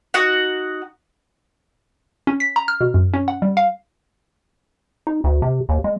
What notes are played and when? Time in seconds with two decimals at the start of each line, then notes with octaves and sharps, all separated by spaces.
0.14 D#4 F#4 F#5
2.27 C#4
2.40 B6
2.56 A#5
2.68 F6
2.81 B2
2.94 F#2
3.14 C#4
3.28 F#5
3.42 G3
3.57 F5
5.07 D#4
5.24 D2
5.42 C3
5.69 D#2
5.84 G#3